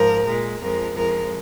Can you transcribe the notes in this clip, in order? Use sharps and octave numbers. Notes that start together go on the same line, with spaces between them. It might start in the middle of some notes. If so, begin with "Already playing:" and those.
Already playing: G#2 F3 A#4
A#2 G#3
F2 F3 G#3 A#4
F2 F3 G#3 A#4